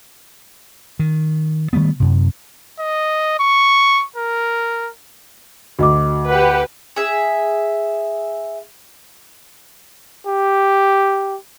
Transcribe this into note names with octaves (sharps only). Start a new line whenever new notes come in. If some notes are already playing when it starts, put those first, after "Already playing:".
D#3
D#3 G3 A3 B3
F#2 C3
D#5
C#6
A#4
D2 F#4 D#5 D6
G4 B4 F#5
G#4 E5
G4